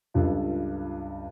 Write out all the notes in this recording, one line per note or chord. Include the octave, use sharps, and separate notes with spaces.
C#2 G2 F4 A4